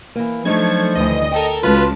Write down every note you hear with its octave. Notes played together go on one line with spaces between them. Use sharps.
E3 A#3
F3 F#3 A3 D4 D#4 A4 C#6 G#6
D2 G2 D#3 E3 D#5
A4 A#4 G5
C#2 F4 F#4 B4 A5